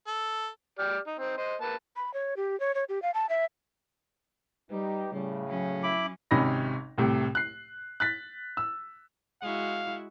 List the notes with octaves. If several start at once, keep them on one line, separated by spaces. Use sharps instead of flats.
A4
G4 D5 F6
D#4
C4 D#4
C5 D#5
A#3 B4 A5
B5
C#5
G4
C#5
C#5
G4
F5
A5
E5
G3 D#4 G4 B4
A2 C#3 G3
F#3 C#4
E4 B5 D6
G#1 C3 C#4 D#4 B5 A#6
C2 A2 C3
F#6 C7
F#6 A6 B6
E6
G#3 E4 F#4 F5